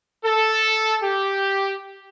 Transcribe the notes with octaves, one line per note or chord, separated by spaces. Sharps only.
A4
G4